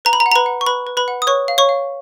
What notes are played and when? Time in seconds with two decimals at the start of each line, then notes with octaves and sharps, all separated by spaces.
0.05 B4 A#5
0.13 B5
0.20 A#5
0.26 F#5
0.32 A#5
0.36 B4 B5
0.46 F#5
0.61 C#6
0.66 B4 B5
0.87 B4
0.97 B4 B5
1.08 F#5
1.22 D#6
1.27 B4 C#5 C#6
1.48 F5
1.58 C#5 C#6
1.69 F5